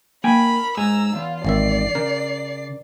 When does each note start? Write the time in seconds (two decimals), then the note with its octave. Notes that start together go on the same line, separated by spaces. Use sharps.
0.24 A#3 A#4 G5 G#5 B5
0.77 G#2 G#4 A#5 E6
1.15 E2 F4
1.45 G#1 D#3 D5 E5 C7
1.95 C#3 A#4